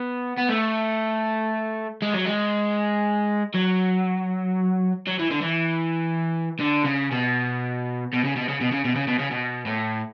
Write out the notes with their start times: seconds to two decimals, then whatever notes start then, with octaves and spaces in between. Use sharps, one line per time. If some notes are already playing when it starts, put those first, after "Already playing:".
Already playing: B3
0.38 B3
0.49 A3
2.02 G#3
2.14 F#3
2.25 G#3
3.55 F#3
5.07 F#3
5.19 E3
5.31 D3
5.42 E3
6.60 D3
6.85 C#3
7.11 B2
8.14 B2
8.25 C#3
8.36 B2
8.49 C#3
8.61 B2
8.72 C#3
8.85 B2
8.96 C#3
9.08 B2
9.19 C#3
9.31 B2
9.66 A2